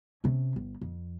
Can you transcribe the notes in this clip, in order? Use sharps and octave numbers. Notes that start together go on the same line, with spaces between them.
C3 C#4
G1
F2